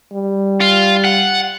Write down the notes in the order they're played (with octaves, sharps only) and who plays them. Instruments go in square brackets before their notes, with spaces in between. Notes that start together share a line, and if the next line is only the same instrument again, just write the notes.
[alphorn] G3
[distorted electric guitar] F4
F#5